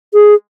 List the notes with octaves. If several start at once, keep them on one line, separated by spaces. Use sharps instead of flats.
G#4